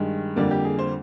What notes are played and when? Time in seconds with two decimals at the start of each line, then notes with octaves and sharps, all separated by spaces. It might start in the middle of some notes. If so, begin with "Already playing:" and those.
Already playing: G2 D#3 G#3
0.36 F2 D3 G3 A#3 D5
0.51 G4
0.64 G#4
0.79 C5